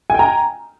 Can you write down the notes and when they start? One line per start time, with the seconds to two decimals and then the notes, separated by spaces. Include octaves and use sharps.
0.10 G#5
0.14 G5
0.19 A#5